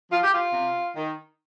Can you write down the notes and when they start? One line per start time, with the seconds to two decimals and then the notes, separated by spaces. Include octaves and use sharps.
0.10 F3 F4
0.23 G4
0.32 F4
0.53 C3
0.95 D#3